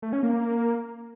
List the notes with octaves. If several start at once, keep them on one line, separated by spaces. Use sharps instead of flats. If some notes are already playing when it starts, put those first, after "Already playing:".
A3
C#4
A#3
A#3